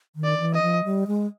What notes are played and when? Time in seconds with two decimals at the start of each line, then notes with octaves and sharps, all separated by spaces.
0.16 D#3
0.24 D5
0.39 E3
0.54 D#5
0.62 F3
0.84 G3
1.07 G#3